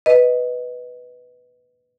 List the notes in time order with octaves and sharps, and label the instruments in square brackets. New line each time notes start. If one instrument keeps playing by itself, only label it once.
[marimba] B4 D#5